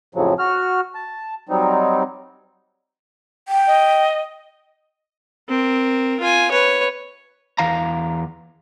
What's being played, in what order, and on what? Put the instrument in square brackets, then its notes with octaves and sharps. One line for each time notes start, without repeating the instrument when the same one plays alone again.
[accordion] F2 A2 C#3 F3 F#3
F#4 F6
A5
F#3 G3 C4 D#4
[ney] G5
[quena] D#5
[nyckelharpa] C4 A#4
F4 G#5
B4 C#5
[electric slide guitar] E2 E3 F5 A#5